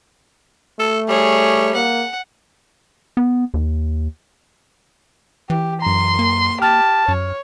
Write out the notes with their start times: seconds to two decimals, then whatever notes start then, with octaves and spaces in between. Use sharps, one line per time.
0.79 A3 A4
1.09 G3 G#4 C#5
1.75 A#3 F#5
3.17 B3
3.54 D#2
5.50 E3 G4
5.82 F#2 A#5 C6
6.19 A#3
6.62 G4 A5 F6
7.08 F#2 C#5